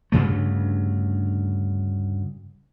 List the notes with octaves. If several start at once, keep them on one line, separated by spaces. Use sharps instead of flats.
D2 G2 C#3 A3